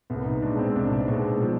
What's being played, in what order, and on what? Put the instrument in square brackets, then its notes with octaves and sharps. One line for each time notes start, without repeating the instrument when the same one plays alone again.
[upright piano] C2 [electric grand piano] B3
[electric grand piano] D#4
[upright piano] B2 G#3 [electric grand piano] D4
[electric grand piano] C4
[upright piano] C2 [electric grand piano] D4
[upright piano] B2 G#3
F3